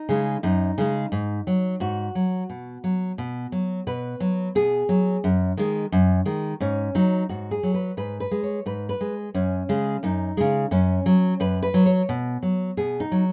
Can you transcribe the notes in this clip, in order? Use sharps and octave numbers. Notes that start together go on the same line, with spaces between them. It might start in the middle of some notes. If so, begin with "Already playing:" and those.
Already playing: D#4
C#3 G#3
F#2 D#4
C#3 G#3
G#2
F#3
G#2 F#4
F#3
B2
F#3
B2
F#3
B2 B4
F#3
B2 G#4
F#3
F#2
D#3 G#3
F#2
D#3 G#3
G#2 C#4
F#3 D#4
G#2 F#4
G#4
F#3
B4
G#2 B4
B4
G#3
C#5
G#2 B4
B4
G#3
F#2 C#4
C#3 G#3
F#2 D#4
C#3 G#3
F#2 C#4
F#3
F#2 B4
B4
F#3
C#5
B2
F#3
B2 G#4
D#4
F#3